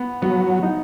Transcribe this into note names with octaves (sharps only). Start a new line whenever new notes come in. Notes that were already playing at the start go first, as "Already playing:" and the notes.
Already playing: B3
F#3 B3
D#4